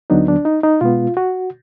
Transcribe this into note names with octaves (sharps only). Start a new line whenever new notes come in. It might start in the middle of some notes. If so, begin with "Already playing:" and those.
D2 D3 F#3 B3 D4 D#4
D4
D#4
D#4
B2 G#3 B3 F4
F#4